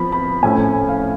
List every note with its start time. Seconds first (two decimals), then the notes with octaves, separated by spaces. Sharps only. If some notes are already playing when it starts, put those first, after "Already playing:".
Already playing: F3 B3 B5
0.12 B5
0.43 A2 F3 A3 C#4 G#5
0.89 F5